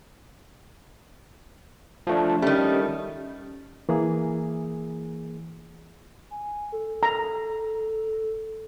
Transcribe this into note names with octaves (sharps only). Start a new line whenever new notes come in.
F3 A3 D4
D#3 G3 A3 C#4
E3 A#3 G#4
G#5
A4
A#5